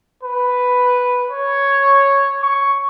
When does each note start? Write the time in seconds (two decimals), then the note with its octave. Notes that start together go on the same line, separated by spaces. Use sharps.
0.23 B4
1.31 C#5
2.42 C#6